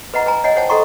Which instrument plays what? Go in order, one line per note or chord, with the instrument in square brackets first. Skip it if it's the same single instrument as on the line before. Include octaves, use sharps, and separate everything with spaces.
[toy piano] B4 D#5 F#5 A#5
B4 G#5 A#5
C#5 D#5 F#5 G#5
C5 C#5 F#5 G5 A5
A4 D#5 F#5 A#5 C6 C#6